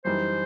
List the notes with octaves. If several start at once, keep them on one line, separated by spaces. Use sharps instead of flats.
F#2 E3 G3 D#4 C5